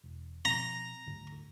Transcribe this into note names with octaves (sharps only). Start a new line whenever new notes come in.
E1
B2 F3 C4 A#5
D2 G#2 D3